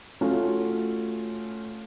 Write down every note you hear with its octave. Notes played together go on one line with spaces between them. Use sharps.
A3 C#4 F4 F#4